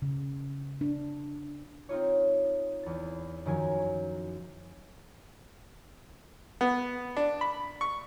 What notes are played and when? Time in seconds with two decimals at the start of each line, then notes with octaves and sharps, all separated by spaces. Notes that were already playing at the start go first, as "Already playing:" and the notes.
0.02 C#3
0.81 D4
1.89 C4 D#4 F4 C#5
2.83 E2 A6
3.46 F#2 D#3 F3 C#4 G#5
6.61 B3
7.17 D4
7.41 B5
7.81 C#6